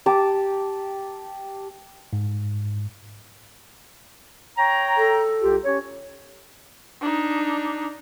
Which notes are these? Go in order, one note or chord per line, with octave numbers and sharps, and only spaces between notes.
G4 A5 A#5 D6
G#2
C#5 G5 A#5
A4
C2 F4 G4
C#4 G4 C#5
D4 D#4